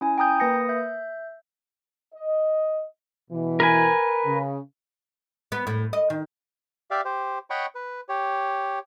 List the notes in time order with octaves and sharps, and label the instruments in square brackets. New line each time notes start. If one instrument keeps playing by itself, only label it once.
[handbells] C#4 E4 G#5
G5 A#5 D#6 G6
A#3 B4 D#6 A#6 C#7
E5 G6
[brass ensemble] D#5
B2 E3
[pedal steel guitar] A#4 B4 G#5
[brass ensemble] C#3
[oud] B3
A2
D#5
D#3
[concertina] G4 D5 E5 F5
G4 C5
C#5 D#5 F#5 G5 B5 C#6
B4
G4 C#5